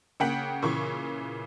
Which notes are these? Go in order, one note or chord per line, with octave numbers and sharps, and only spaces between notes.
C#3 A#3 F#5 G5 B6 F#7
A#2 C#3 E3 C#6